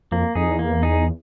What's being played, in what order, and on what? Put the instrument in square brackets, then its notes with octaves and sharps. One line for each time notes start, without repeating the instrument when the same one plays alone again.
[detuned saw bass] F2 [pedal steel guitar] A#3
[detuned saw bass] F2 [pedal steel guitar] D#4 G#4
[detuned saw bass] E2
[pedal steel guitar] A#3
D#4 G#4